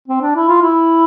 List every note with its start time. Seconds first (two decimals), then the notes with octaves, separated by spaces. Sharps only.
0.08 C4
0.21 D4
0.35 E4
0.48 F4
0.62 E4